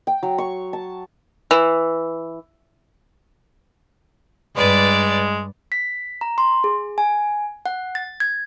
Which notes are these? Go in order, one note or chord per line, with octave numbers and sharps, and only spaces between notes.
G5
F#3
C#6
A5
E3
G2 G#3 B4 D5
B6
A#5
C6
G#4
G#5
F#5
A6
G#6